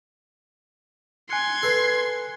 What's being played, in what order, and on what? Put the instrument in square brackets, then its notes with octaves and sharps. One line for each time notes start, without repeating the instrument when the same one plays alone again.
[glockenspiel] G#5 F#6 C#7 [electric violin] C6 G#6
[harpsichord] A4 B4